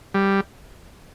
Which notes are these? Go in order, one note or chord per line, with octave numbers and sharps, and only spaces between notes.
G3